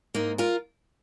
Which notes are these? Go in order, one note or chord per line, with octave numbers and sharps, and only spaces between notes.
G#2 A#3 D#4
F4 A#4